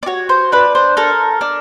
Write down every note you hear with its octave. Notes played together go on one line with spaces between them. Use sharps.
D5
F#4 C#5
C5
D4 B4
C5
A4 A#4
D4